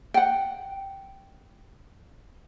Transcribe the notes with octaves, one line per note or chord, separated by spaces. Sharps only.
F#5 G5